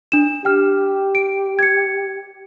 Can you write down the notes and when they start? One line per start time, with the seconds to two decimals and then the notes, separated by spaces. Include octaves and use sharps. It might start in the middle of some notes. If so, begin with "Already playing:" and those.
0.12 D4 E7
0.45 G4 G5 F6
1.15 D7
1.59 G#6 C#7